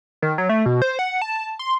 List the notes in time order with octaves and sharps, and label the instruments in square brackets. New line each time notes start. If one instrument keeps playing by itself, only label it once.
[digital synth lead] D#3
F#3
A3
B2
C5
F#5
A5
C6